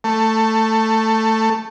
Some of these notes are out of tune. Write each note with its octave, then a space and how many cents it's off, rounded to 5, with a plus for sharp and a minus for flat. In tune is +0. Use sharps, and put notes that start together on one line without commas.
A3 +10